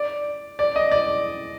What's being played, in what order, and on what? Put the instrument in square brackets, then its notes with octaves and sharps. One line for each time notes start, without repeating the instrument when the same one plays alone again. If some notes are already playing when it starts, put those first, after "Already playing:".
Already playing: [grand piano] D5
D5
D#5
D5